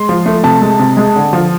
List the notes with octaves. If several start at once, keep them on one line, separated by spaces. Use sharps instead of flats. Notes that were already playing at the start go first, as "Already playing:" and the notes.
Already playing: G#3 C6
F3
A3
C3 A5
G#3
C3
G#3
D3
F3